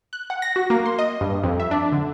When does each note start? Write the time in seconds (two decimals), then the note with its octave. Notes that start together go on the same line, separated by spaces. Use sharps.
0.13 F#6
0.30 F#5
0.42 A#6
0.56 F#4
0.70 A#3
0.86 C6
0.99 D#5
1.21 G2
1.44 F2
1.60 E5
1.71 D4
1.92 D3